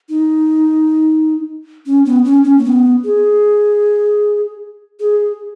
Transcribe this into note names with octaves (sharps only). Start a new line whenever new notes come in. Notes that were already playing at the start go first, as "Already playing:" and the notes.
D#4
C#4
B3
C#4
C#4
A#3
B3
G#4
G#4